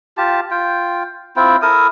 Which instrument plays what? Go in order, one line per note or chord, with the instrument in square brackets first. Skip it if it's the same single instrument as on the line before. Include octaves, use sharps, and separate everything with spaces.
[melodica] F4 G4 A5
F4 G5
C4 E4 F4 G5
E4 A4 A#4 D#6